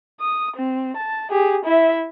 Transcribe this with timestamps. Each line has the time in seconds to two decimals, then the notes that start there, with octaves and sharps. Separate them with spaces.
0.20 D#6
0.56 C4
0.97 A5
1.31 G4 G#4
1.65 E4 E5